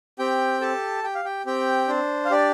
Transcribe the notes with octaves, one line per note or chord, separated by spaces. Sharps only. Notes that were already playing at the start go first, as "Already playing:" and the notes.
C4 G4 G5
G4 A4 A5
G4 G5
F5
G4 G5
C4 G4 G5
D4 C5
F5
D4 G4 D5